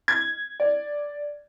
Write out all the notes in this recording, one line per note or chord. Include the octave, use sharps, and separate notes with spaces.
G#6
D5